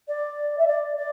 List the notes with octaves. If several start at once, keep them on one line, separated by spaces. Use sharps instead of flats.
D5
E5
D5
D5